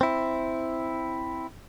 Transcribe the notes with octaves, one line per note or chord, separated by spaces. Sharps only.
C4 E4